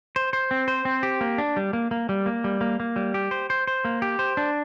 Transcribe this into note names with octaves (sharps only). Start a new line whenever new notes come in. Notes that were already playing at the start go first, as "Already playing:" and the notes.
C5
C5
C4
C5
C4
G4
A#3
D4
G3
A#3
A#3
G3
A#3
G3
A#3
A#3
G3
G4
C5
C5
C5
A#3
G4
C5
D4